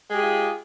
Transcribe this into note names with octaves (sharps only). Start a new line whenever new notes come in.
G#3 F4 G4 G#4